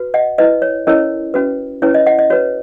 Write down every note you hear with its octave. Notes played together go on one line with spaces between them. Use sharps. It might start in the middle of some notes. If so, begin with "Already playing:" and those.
Already playing: F#4 B4
D#5 F#5
E4 B4 D#5
C#5
C#4 E4 A#4 C#5 D#5
C#4 F#4 B4
C#4 E4 B4 C#5
D#5
D#5 F#5
D#5
F#4 B4 C#5